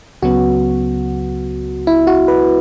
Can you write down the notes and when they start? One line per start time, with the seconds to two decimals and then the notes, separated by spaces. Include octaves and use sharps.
0.22 C#2 C#3 F#3 B3 F#4
1.87 E4
2.07 F#4
2.28 B4